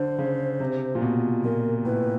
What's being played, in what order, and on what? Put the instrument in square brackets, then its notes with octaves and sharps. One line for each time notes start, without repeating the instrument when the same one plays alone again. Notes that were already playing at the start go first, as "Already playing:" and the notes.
Already playing: [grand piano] D3 [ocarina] C5
[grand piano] C#3
C3
A#2
B2
[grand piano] A#2 [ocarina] A#4
[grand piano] A2 [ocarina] B4